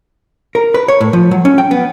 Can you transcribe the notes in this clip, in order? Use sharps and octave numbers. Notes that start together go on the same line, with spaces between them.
A#4
B4
C#5
A2
F3
F#3
C#4
G5
B3